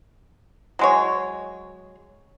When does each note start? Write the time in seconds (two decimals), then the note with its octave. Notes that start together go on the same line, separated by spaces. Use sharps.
0.79 F#3 G#3 C#5